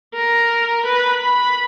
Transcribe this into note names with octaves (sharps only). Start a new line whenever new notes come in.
A#4
B4
B5